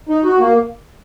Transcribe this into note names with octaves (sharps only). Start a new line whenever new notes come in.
D#4
F#4
A#3